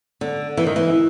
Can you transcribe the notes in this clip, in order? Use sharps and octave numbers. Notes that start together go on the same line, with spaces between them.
D3
E3
D#3
E3